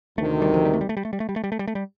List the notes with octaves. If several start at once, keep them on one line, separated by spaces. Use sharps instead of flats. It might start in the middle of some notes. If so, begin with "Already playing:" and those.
D2 C3 D#3 A3
G3
F3
G3
A3
G3
A3
G3
A3
G3
A3
G3
A3
G3
A3
G3
A3
G3